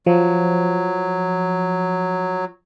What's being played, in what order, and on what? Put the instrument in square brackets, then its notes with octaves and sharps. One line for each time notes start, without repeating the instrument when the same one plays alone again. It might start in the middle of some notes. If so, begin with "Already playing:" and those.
[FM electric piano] F3 [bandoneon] F#3